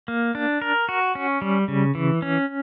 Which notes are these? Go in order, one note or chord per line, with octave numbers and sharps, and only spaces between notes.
A#3
D4
A#4
F#4
C#4
G3
C#3
E3
C#4